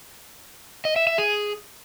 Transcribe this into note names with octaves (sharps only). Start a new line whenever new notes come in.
D#5
E5
E5
G#4